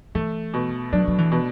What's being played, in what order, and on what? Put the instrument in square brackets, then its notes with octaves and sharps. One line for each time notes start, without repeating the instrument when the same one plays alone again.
[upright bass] E3 [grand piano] A3
[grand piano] B2
[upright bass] F#3 [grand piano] D4
[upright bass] F#3
E3
[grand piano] B2